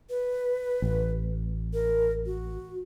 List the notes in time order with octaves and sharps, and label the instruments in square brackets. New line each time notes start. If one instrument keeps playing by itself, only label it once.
[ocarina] B4
[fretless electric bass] A1
[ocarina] A#4
F#4